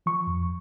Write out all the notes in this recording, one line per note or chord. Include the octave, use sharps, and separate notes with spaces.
F3 C#6
F2